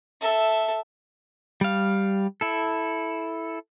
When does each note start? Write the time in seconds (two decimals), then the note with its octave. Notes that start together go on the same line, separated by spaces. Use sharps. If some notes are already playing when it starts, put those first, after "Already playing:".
0.21 A4 E5
1.61 G3 F5
2.41 E4 A4